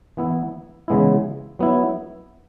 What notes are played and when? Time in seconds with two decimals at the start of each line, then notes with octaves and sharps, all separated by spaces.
0.17 E3 B3 E4
0.88 C#3 E3 G#3 B3 E4
1.59 F#3 B3 E4